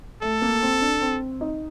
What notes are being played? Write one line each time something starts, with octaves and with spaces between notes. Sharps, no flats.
A3 A4
A#3
C4
D4
C4
D#4